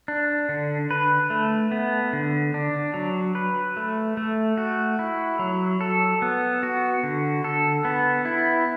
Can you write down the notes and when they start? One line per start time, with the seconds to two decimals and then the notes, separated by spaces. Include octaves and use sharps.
0.08 D4
0.49 D3
0.91 B4
1.30 A3
1.72 B3
2.13 D3
2.54 D4
2.94 F#3
3.35 B4
3.77 A3
4.17 A3
4.57 F#4
4.99 E4
5.39 F#3
5.81 A4
6.22 B3
6.63 F#4
7.03 D3
7.44 A4
7.85 B3
8.25 E4